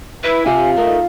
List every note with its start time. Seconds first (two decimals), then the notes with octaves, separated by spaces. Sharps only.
0.23 E4 B4
0.46 C3 F4 G#5
0.76 A3 D#4 A#4